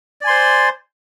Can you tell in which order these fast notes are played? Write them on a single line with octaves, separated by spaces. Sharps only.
D5 G#5 C6 C5